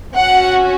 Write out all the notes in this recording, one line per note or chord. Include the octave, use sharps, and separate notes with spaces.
C#4 F#4 F#5